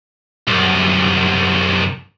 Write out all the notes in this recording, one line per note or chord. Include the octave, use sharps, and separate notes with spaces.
C2 F#2